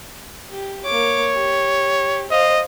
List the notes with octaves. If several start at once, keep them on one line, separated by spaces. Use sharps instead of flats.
G4
A#3 C#5 D6
G4
C5 D#5 F5